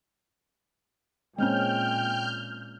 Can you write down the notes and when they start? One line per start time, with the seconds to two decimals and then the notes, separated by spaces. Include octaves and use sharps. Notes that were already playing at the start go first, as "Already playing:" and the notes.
1.38 A#2 G#3 C4 C#4 G5 F6 G6